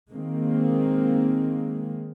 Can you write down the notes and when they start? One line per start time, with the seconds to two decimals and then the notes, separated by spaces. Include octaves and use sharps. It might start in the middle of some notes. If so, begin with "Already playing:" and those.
0.10 D#3 G#3 A#3 C4